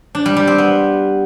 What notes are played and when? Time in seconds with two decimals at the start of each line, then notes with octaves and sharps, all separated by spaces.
0.15 D4
0.26 G3
0.36 G3
0.47 C4
0.58 B3